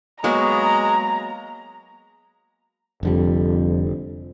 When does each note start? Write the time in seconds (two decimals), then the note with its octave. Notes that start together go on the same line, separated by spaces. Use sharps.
0.24 F#3 G#3 A#3 B3 A#5
3.03 F1 F2 D3 G3